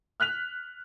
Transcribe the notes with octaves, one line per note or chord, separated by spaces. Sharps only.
F6 F#6 B6 F7